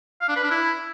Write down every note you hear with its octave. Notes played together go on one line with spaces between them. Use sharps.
F5
D4
B4
D4
E4